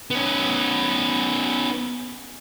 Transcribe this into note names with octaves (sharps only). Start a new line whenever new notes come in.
B3 C#4